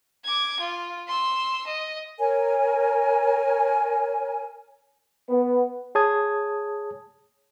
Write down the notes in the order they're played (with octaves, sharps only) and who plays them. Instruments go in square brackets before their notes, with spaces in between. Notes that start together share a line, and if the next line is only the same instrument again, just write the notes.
[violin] D6 G#6
F4
C6 E6
D#5
[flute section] A#4 C#5 G#5
[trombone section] B3
[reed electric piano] G#4 C#5 A5 D#6 G#6